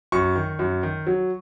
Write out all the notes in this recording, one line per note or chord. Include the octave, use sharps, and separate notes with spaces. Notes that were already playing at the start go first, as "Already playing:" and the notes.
F#2 C#6
D#3
F#2
D#3
F#3